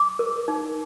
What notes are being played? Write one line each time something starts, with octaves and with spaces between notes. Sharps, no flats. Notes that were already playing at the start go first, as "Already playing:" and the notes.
Already playing: D6
A#4
D#4